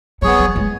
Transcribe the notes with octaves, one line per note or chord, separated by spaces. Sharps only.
F#3 B3 G#4 C#5
F#3
G#3